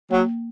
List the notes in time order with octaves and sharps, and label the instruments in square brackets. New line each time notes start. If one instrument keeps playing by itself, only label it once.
[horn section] F#3 [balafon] A#3